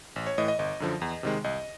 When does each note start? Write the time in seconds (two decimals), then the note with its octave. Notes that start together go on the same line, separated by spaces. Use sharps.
0.16 A1
0.27 C#5
0.38 A2 E3 D#5
0.48 D#5
0.59 G1 D#5
0.80 F#2 D3 F3
1.02 E2
1.23 C3 D#3 G#3
1.44 C2 D#5